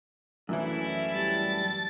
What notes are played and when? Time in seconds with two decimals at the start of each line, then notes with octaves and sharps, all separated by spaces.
0.49 F#2 A2 E3 C#4 D4 E4
1.14 G3 A5 A6